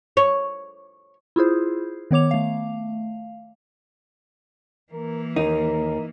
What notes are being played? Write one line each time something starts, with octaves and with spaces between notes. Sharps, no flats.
C#5
E4 F4 G#4 C5
D#3 B3 C#5 D6 F7
A3 F5
E3 A#3 A#4
D#2 D#4 A#4